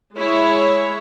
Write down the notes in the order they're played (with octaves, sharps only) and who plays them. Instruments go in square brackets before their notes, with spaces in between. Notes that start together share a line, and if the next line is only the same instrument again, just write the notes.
[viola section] G#3 E4 C#5